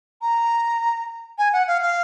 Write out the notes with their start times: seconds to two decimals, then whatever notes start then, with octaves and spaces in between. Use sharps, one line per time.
0.22 A#5
1.38 G#5
1.53 F#5
1.68 F5
1.82 F5